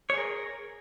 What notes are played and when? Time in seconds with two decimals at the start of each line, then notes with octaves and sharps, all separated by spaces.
0.10 C#5
0.14 G#4
0.18 A#4